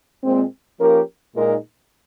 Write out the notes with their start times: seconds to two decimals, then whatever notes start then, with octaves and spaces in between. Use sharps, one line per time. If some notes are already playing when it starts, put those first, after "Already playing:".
0.24 A#2 G#3 C4
0.80 F3 A#3 C#4 G4 A#4
1.36 A#2 G#3 D#4 A#4